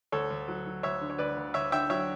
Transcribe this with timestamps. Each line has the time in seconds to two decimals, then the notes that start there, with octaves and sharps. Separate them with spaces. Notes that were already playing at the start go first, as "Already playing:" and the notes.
0.12 D2 A4 C#5
0.30 D2
0.48 F#3
0.66 F#3
0.83 D2 C#5 E5
1.01 D3
1.10 C#5
1.18 D2 B4 D5
1.37 D2
1.54 D2 C#5 E5
1.72 D3 E5 G5
1.90 F#3 C#5 E5